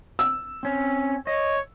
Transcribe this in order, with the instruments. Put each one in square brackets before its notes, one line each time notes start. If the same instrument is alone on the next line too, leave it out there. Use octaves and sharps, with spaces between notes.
[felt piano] E6
[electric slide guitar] C4 C#4
[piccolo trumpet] C#5 [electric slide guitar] D#5